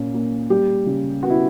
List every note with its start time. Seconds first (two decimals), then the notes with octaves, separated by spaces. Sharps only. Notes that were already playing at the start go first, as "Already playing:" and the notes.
Already playing: A#2 A#3 C#4
0.14 A#3
0.50 G3 G4
0.86 C#3
1.23 B3 F#4
1.30 E4